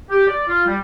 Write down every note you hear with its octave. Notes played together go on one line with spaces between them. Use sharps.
G4
D5
F4
G3